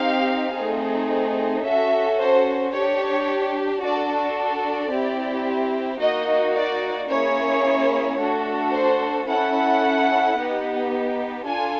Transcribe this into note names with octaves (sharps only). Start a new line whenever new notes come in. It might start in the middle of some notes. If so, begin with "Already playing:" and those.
Already playing: C4 D#4 G4 F5
A3 C4 D#4 G#4
C#4 F#4 A4 E5
C5
D4 G4 C#5
D4 F#4 A4 D5
D5
C4 E4 G4
A#3 D#4 F#4 D#5
D5
A#3 C#4 E4 G#4 C#5
A3 D4 F#4 A4
C5
C#4 E4 A4 F#5
B3 D#4 G4
D4 F4 A4 G#5